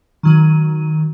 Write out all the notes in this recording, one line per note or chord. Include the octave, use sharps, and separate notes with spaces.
D#3 F#3 D#7